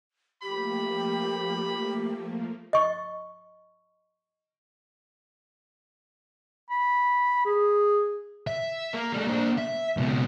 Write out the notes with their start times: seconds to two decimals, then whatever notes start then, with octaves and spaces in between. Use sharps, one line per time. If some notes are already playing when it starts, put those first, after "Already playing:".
0.43 F3 A3 A#3 G4 B5
2.73 D#5 C#6
6.70 B5
7.45 G#4
8.47 E5
8.94 A#3
9.13 G3 A3
9.28 A#3 D4
9.58 E5
9.97 C#2 B2